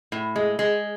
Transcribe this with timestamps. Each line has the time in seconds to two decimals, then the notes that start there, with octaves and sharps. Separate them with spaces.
0.12 A2
0.36 G#3
0.59 G#3